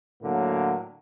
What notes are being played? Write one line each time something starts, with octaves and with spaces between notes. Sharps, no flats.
A2 D3 F#3 A#3